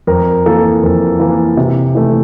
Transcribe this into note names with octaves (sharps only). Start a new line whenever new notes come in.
F2 A#4
E3 A#3 A4
F2 A#4
E3 A#3
C3
E3 A3